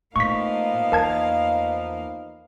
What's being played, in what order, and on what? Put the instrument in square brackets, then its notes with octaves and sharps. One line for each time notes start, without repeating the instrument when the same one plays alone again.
[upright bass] A2 [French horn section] F3 B3 D#4 [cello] A#3 F5 [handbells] C#6 B6
[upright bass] E2 [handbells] A#4 A5 G#6